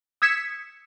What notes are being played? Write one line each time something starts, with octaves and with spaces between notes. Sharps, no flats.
D#6 E6 G#6 B6 C#7 E7